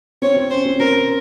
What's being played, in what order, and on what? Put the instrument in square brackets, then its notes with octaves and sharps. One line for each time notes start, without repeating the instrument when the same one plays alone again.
[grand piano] C4 [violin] C#5
[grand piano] C4
[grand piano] C#4 [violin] C5
[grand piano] C4
[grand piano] C4 [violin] A#4